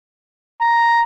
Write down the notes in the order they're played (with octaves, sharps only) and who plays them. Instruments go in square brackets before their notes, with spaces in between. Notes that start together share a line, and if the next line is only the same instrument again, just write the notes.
[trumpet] A#5